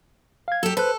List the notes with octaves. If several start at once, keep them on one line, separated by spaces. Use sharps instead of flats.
F5 G#6
F#3 G4 A4
A4 B4 C5 F#6